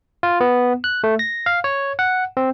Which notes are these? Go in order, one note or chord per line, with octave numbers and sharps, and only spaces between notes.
F4
B3
F#6
A3
A#6
F5
C#5
F#5
C4